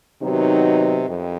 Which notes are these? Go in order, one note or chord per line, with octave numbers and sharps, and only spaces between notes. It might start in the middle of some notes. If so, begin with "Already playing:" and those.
C3 D#3 F#3 B3 D#4
F2